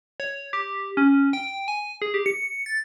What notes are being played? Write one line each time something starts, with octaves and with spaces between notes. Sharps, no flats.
C#5
G4
C#4
G5
G#5
G#4
G4
C#7
A6